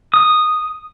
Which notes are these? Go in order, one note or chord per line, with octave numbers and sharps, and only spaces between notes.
D#6